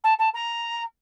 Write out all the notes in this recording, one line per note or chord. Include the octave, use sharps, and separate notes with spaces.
A5
A5
A#5